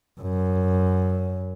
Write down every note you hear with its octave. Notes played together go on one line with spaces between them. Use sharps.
F#2